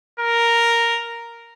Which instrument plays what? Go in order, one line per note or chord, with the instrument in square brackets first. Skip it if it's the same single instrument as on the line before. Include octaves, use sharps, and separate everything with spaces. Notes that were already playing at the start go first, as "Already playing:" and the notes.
[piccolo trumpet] A#4